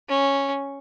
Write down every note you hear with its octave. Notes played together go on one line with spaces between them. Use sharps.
C#4